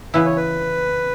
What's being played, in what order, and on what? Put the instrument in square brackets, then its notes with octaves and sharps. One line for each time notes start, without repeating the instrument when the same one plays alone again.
[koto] C#3 E3 B3 E4 [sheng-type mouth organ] B4
[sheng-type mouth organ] C#5
B4